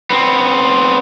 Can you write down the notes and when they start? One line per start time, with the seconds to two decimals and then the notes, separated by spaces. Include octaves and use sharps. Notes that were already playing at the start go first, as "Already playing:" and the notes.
0.10 B3 C4